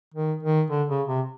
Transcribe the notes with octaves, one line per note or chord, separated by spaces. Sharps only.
D#3
D#3
D3
C#3
C3